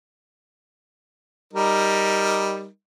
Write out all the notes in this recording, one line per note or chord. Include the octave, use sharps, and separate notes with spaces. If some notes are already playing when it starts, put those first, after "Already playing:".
G3 D#4 A#4